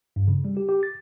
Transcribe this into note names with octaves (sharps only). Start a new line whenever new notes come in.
G2
C#3
G3
G4
G4
A6